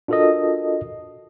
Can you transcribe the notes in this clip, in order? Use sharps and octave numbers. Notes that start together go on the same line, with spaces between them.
D4 F4 F#4 A4 A#4 D#5